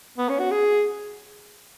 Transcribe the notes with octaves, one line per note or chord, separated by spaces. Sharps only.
B3
C#4
F#4
G#4